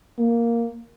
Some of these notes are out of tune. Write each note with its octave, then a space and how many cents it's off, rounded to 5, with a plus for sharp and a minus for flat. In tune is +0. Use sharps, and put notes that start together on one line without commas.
A#3 +0